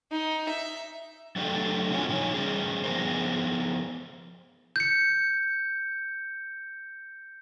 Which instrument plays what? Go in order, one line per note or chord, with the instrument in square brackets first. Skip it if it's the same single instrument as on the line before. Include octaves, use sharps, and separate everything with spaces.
[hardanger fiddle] D#4
E5
[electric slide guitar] F#3 A3 D4 F#4 G4 A4
C4 F4 F#4 C#5 F5 G#5
A#2 F3 A#3 D#4 C#5
G3 C#4 G#4
F3 B3 G#4 A#4 C5
[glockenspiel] G6 C#7